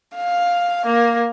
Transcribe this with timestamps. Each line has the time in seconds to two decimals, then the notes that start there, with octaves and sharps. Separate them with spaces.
0.16 F5
0.85 A#3